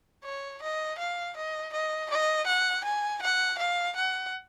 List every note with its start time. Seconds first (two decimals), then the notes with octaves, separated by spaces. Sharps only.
0.24 C#5
0.62 D#5
0.99 F5
1.36 D#5
1.73 D#5
2.10 D#5
2.47 F#5
2.84 G#5
3.22 F#5
3.58 F5
3.96 F#5